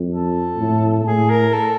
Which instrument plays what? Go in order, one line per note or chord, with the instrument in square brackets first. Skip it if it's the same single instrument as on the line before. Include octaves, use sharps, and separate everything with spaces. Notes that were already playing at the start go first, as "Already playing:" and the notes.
Already playing: [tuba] F2
[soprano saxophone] A4
[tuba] A2
[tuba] A2 [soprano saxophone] G#4
[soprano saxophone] A#4
A4